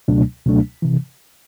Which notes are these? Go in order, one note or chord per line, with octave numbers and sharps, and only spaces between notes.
C#2 B2 F#3 A3 D4
C#2 B2 F#3 A3 D4
C3 E3